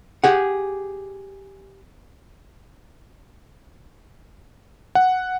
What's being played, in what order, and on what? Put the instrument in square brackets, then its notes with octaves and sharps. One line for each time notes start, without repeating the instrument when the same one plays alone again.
[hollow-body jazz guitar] G4 G#4 F#5
[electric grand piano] F#5